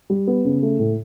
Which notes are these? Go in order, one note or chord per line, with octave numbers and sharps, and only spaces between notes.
G3
B3
C#3
A3
A2